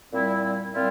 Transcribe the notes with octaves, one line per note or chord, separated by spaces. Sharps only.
A#2 G3 C4 E4
E4
A#2 G3 C4 E4 F4